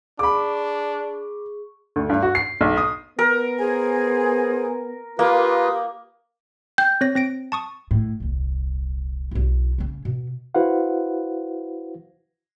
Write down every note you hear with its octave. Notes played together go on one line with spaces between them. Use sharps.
D4 G#4 B5 C#6 D6
D2
G2
F#4
C7
B1
D#6
B3 A#4
G#4 C5 G#5
A#3 F4 G4 B4 D#6
G5 G6
C4 C#5 A#6
C4 A#6 D7
A5 C#6 D#6
A2
D#1 C2
B1 E4
C#3 C#4
B2
E4 F#4 B4 C5 F5 F#5